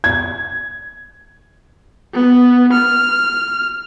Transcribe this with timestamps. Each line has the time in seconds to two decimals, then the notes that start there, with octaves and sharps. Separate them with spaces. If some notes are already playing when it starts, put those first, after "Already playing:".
0.04 G#6
2.13 B3
2.72 F6